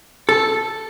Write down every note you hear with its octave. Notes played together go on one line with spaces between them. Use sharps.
A4